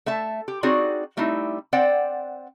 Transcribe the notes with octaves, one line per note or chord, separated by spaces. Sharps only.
A3 E5 A5
G4
C4 D#4 F#4 G#4 C#5 D5
G3 A3 C4 D#4 E4
C4 C5 D5 F#5 G5